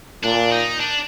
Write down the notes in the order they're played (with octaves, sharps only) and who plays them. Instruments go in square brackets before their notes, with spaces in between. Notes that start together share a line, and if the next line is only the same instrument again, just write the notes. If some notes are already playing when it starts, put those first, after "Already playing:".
[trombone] A#2 [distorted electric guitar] D4
[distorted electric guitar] D#4
D4